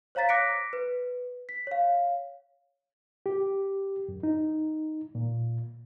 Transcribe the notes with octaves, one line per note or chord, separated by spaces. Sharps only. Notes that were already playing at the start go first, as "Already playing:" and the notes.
C5 C#5 F5 A#5 A6 B6
D6 F#6 A#6 B6 C#7 D7
B4
B6
C#5 F5
G4
F#2
D#4
A#2